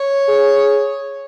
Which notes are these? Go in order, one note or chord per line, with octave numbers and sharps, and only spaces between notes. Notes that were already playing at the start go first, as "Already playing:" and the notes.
Already playing: C#5
G#4